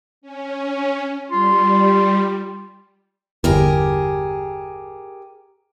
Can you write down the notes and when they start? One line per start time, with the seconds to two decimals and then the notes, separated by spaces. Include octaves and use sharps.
0.22 C#4
1.31 G3 F4
3.44 G1 E2 G4 G#4 A#4